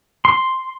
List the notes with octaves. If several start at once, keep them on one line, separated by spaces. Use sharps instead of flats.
C6